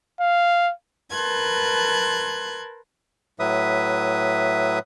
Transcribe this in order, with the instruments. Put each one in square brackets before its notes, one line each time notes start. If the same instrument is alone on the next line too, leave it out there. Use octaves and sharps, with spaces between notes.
[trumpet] F5
[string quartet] A#4 B4 A5 C6 F#6 G#6
[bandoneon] A2 F#3 B4 E5 D#6